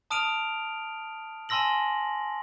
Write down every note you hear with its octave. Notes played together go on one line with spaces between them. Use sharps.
A5 D#6 F6 D7 D#7 F7
G#5 A5 C6 E6 A#6 F#7